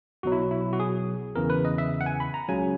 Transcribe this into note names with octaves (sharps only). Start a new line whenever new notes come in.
B1 B2 F#3 F#4
E4
E4
F#4
G#4
E2 C#3 E3 A#4
B4
D#5
E5
F#5
G#5
B5
A#5
C#2 C#3 F#3 G#5